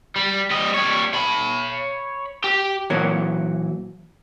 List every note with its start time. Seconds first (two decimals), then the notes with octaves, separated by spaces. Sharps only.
0.16 G3
0.51 G3 D#5
0.74 G3 C#5
1.14 C#5 B5
2.44 G4
2.90 A#2 E3 F#3 A#4 C#5